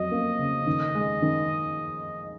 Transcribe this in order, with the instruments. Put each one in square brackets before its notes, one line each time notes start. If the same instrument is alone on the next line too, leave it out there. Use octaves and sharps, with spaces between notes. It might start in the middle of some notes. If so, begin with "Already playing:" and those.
Already playing: [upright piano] F2 F#3 [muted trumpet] D#5
[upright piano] A#3
C#3
D#3
G#3
D#3